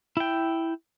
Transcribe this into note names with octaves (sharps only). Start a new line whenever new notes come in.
E4 G5